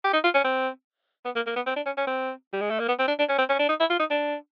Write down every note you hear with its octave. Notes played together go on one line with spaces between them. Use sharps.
G4
D#4
F4
C#4
C4
B3
A#3
A#3
B3
C4
D4
C#4
C#4
C4
G3
G#3
A3
A#3
B3
C4
D4
D4
C#4
C4
C#4
D4
D#4
E4
F4
D#4
D4